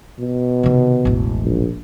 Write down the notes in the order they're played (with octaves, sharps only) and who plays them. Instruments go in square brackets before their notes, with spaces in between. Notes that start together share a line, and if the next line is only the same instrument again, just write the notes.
[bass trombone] B2
[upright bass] C3 D#3
E1 A1
[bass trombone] A#1